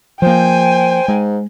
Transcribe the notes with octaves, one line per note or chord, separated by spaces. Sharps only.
F3 A#3 C5 G5 G#5
G#2 G#3